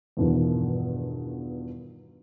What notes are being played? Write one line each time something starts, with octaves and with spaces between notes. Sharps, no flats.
E2 G2 B2 D#3 F3